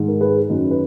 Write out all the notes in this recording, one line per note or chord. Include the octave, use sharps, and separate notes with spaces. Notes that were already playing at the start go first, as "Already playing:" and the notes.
Already playing: G#2 D#3
A#4
G#4 B4
F#2 D#3
B4